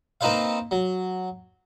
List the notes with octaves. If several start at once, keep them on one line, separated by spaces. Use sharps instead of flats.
A#3 C4 D#4 B4 C5 F5
F#3